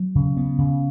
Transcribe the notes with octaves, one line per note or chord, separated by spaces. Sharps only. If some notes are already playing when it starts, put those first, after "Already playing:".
Already playing: F#3
C#3
B3
C#3